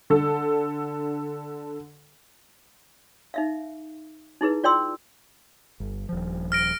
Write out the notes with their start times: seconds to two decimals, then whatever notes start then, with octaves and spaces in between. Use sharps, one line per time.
0.10 D3 A4
3.34 D#4 E5 F5
4.41 D#4 E4 G#4 B4
4.64 F4 D5 G5 C6 E6
5.80 G1
6.09 D#1 F3
6.52 F6 A#6 D7